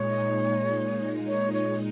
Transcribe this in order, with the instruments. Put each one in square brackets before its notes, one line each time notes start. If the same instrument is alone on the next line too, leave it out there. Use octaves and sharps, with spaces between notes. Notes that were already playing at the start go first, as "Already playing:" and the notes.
Already playing: [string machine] A#2 G#3 D#4 [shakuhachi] C#5
[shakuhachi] C#5
C#5